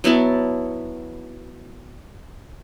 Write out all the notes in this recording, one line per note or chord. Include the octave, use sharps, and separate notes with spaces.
F#3 B3 E4 A5